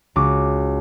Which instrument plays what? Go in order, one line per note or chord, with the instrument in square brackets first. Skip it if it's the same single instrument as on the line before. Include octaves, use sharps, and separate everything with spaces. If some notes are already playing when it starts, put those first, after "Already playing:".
[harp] C#2 F#4 D6